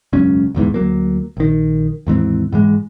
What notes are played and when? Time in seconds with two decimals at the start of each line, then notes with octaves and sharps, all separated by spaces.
0.13 E1 C#2 F#2 C#4
0.55 D1 E2 G#2 E3
0.74 D2 F#3 A#3
1.37 A#1 D#3
2.07 D#2 G#2 E3 C4
2.52 G#2 E3 G#3